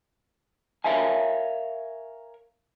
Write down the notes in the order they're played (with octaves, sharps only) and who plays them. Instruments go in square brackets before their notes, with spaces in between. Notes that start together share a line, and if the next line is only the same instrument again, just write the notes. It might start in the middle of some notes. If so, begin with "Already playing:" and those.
[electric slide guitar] A#4 C#5 E5 F5 G#5